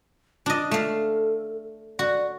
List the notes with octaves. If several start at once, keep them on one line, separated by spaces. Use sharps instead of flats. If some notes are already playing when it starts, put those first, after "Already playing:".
D4 F4 D#5
A3 A4 F5
F#4 D5